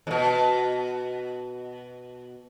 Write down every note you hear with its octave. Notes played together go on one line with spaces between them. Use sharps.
F2 B2